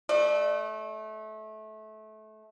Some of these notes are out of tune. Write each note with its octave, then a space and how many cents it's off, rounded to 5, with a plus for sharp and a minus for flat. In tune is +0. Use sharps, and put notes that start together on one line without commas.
A3 -25 D5 +30